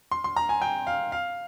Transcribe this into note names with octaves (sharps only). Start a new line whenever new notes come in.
C6
C6
A#5
G#5
G5
F5
F5